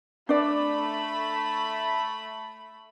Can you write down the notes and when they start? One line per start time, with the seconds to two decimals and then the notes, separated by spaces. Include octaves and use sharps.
0.29 A3 D4 D5 B5